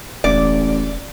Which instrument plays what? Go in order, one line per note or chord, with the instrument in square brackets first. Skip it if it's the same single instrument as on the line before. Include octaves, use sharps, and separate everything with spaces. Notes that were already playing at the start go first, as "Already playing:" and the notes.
[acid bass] E1 [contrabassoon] A1 [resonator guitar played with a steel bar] D5